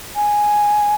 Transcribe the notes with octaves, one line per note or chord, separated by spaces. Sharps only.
G#5